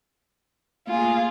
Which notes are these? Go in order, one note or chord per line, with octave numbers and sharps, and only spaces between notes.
A3 A#3 F4 G#4 F5